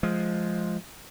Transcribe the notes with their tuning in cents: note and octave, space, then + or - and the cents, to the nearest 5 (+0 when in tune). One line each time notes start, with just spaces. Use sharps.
F3 +0 G#3 +10